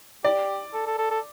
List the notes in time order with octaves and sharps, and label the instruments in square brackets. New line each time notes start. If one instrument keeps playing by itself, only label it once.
[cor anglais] G4 [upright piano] D5
[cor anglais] A4
A4
A4
A4